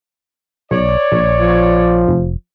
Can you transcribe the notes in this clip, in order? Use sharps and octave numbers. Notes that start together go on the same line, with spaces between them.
B1 C#5 D5
A#1
F3
F1